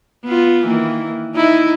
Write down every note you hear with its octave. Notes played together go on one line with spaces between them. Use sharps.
B3 F4
D#3 E3 A#3
D#4 E4